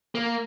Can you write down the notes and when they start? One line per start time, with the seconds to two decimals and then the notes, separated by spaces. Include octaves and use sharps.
0.15 A#3